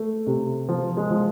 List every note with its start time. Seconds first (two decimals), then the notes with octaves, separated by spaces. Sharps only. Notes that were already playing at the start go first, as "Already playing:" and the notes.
Already playing: A3
0.27 C3
0.69 F3
0.97 G#3
1.10 F3